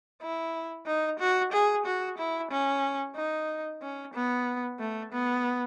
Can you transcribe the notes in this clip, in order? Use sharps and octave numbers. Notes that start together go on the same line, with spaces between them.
E4
D#4
F#4
G#4
F#4
E4
C#4
D#4
C#4
B3
A3
B3